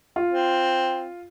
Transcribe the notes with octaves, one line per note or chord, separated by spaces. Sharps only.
F4
C4